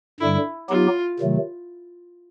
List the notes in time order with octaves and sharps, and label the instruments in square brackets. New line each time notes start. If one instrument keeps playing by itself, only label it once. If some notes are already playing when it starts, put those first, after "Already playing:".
[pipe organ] G2 D3 G3 [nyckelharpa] E4
[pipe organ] F#3 B3 D#4 G4 [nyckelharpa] F4
[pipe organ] C3 D#3 F#3 A3